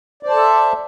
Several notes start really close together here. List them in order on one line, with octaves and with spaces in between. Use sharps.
D5 C5 A5 A4 E5